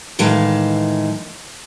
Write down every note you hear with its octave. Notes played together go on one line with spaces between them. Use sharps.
A2 D#3 E3 G#3 F5 A5